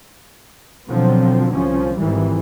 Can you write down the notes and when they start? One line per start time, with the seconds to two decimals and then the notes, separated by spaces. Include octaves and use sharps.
0.88 B2 D3 F3 F#3 C4
1.52 C2 F3 C#4
1.97 G#1 F2 G#2 D#3 E3 G3